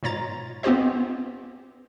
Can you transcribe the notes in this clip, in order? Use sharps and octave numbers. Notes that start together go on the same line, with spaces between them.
G#2 B2 F4 C#5 A#5 A6
B3 C4 F4 G4 C5 D#5